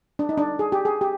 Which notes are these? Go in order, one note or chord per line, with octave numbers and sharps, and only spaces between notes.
D4
D#4
D4
G#4
G4
G#4
G4